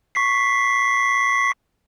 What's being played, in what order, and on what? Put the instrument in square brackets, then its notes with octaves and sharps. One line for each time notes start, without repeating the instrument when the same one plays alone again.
[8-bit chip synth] C#6 B6 C7